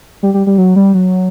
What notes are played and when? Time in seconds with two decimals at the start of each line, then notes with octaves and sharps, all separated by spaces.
0.23 G3
0.34 G3
0.47 G3
0.58 F#3
0.76 G3
0.94 F#3